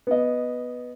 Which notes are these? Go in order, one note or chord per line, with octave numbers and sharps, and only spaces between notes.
B3 D#5